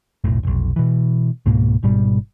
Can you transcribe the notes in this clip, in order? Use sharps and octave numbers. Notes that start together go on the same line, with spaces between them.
F1 B1 A2
F1 B1
B2 E3
C#2 G#2 B2 A#3
G#1 G#2 B2 G3